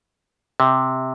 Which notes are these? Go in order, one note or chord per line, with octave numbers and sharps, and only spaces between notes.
C3